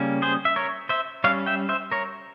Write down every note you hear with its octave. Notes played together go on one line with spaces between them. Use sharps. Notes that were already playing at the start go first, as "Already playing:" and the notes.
Already playing: C#3 G3 A#3 C#4
G#4 C5
E5
A#4 C#5
C5 E5
G3 C#4 C#5 F5
E5 G5
C5 E5
A#4 C#5